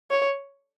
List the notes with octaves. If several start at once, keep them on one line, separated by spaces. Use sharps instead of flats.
C#5